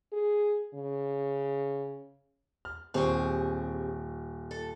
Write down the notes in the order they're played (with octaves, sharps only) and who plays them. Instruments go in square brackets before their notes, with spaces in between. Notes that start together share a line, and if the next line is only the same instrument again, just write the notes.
[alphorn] G#4
C#3
[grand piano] F6
[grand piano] D#1 C#6 [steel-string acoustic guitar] C4 G4 G#4
[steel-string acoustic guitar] A4